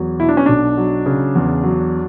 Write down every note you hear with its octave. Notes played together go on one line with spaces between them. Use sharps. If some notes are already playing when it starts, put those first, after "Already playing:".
Already playing: E2 F#3
B2 E4
D4
C#4
B1 D4
F#3
C#3
E2
F#3